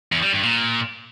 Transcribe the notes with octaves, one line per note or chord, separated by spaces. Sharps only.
E2
G3
G2
A#2